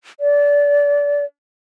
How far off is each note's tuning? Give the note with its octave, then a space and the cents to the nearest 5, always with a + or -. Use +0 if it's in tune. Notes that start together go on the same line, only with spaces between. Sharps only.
D5 -25